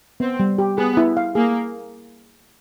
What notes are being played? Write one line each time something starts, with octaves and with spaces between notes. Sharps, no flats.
B3 C4
G3
G4
B3 G#4
E4
F5
A#3 G#4